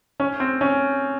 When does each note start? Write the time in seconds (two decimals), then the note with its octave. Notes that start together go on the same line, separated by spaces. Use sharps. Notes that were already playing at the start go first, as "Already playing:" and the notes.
0.20 C#4
0.40 C4
0.61 C#4